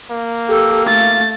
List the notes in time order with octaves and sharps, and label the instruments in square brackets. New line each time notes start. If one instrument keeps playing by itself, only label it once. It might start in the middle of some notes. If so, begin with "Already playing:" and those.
[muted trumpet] A#3
[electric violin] G4 [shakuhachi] A4
[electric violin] A3 A6 [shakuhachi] F5